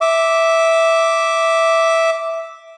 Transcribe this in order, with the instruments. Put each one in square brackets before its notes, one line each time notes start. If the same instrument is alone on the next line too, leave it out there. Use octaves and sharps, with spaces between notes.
[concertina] E5 D6